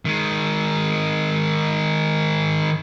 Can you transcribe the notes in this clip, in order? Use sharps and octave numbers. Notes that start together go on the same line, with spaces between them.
D#3 G#3